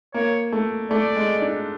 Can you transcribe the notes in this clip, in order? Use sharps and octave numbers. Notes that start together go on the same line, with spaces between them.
A#3 C#5
A3
A3 D5
G#3
D4